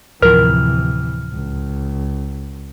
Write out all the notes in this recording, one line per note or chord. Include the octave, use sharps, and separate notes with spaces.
D1 C3 E3 F3 A#4 F6
C#2